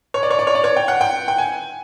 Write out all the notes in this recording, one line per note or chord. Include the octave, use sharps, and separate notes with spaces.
C#5
D5
C#5
D5
C#5
D5
C#5
G5
F#5
G5
G5
G#5